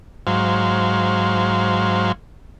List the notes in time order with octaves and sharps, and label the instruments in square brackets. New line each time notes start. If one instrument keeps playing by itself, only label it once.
[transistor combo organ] G#2 F#3 C5 F5